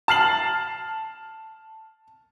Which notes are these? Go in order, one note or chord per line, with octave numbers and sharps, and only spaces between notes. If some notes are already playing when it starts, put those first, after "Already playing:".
A5 F6 C7 F#7